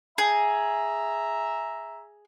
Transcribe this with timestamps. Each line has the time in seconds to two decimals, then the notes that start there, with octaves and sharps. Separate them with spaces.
0.18 G#4 E5 A#5